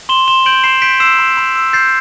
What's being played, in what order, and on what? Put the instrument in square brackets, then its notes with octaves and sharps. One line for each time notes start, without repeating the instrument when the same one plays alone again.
[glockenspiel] C6 E7 G7
C6 E7 G7
G6 D7 F#7
B5 C7 E7
G6 B6 D7
E6 C7 E7
B5
B5
E6
G6 A6 C7